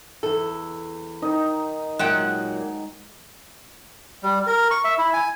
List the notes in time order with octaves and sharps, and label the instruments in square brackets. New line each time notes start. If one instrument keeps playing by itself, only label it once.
[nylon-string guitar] E2 A4
[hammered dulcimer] D#3 D#4 D#5
[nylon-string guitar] A#2 F#3 [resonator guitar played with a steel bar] G#3 F#5 G5
[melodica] G3
A#4
C#6
E5
E4
G#5